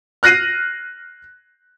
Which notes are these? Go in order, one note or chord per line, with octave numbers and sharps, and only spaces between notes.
F6 F#6 A#6 C7 D#7